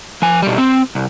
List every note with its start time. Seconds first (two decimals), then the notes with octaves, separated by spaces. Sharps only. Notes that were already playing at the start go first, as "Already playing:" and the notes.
0.22 F3 G#5
0.42 B2 G3
0.58 C4
0.95 C2